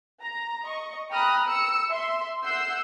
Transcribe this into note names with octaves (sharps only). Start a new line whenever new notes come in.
A#5
D#5 C#6
G5 A#5 B5 D#6 F6 F#6
E6 C#7
E5 C6
F#5 E6 G6 C7